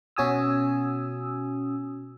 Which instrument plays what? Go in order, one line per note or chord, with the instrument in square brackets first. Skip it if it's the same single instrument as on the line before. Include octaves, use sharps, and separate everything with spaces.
[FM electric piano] B2 C#4 F#4 G#5 D#6 E6